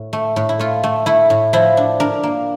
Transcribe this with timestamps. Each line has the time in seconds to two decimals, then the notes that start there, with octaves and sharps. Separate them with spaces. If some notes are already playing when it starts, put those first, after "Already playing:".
Already playing: A2
0.13 A3
0.36 A2
0.49 E4
0.59 A3 F4
0.83 A3
1.06 A3 E4
1.30 A2
1.53 F3 E4
1.77 D4
2.00 D4 A#4
2.23 A#3